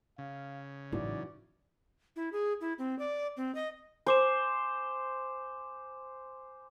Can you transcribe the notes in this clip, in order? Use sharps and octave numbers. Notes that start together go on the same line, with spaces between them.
C#3 F5
A1 G#2 E3 F#3 D5
E4
G#4
E4
C4
D5
C4
D#5
C5 G#5 D6 E7